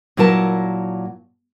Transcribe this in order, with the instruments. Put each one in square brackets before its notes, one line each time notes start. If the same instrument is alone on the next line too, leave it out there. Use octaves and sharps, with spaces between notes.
[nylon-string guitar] A#2 F#3 E4 A#4 A5